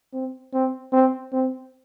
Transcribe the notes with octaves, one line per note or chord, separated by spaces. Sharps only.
C4
C4
C4
C4